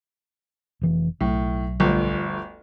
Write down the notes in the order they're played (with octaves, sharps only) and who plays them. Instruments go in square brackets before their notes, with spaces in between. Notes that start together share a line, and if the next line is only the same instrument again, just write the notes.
[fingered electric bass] F1 E3
[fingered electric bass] B1 F#3 [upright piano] A2
[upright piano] G1 D2 F3